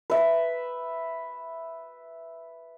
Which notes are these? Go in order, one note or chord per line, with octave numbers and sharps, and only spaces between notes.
B4 E5